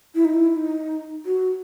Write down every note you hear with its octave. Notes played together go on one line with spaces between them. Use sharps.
E4
D#4
E4
D#4
F#4